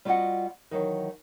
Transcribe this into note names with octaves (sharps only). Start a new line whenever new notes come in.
G3 F4 F#4 C#5 D#5 F#5
D#3 E3 F#3